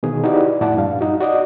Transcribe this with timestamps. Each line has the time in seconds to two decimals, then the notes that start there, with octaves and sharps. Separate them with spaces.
0.03 B2 D#3 G#4
0.24 D#4 E4 F#4 G4 B4 D5
0.61 F2 A2 E4 D5 F#5 A5
0.78 G2 A#2 F5
1.01 D#4 F#4
1.20 F#4 D5 D#5